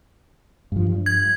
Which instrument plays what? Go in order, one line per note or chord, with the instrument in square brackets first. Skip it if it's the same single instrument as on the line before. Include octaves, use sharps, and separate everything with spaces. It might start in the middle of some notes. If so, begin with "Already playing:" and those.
[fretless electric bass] G2 F3
G2
[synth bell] G#6